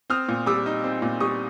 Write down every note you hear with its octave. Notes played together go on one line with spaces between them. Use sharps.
C4 D#6 F6
A#2
G3 D6 E6
D#4
C4
A#2
G3 C#6 D#6